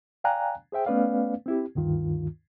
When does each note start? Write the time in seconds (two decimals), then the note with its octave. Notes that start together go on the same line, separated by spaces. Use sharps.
0.24 D5 F5 G5 G#5 A#5 F#6
0.72 G#4 C5 E5 G5
0.86 A3 B3 C#4 B4 D5 F5
1.46 C4 E4 G4
1.75 D2 G2 D#3 F4